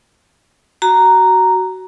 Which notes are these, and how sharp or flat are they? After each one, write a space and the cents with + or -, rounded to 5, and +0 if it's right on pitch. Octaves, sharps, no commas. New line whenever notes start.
F#4 +15 A#5 +0